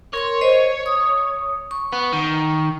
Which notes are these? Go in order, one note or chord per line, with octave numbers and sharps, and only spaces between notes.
A#4 C#5 C6 C#6
C5 D#5
D#6
C#6
B3
D#3